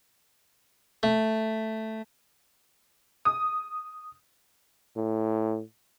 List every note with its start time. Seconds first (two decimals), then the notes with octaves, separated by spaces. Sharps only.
1.03 A3
3.25 D#6
4.96 A2